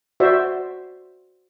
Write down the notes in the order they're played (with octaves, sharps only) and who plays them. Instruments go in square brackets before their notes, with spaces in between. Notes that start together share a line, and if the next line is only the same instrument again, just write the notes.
[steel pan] F#4 C5 D5 E5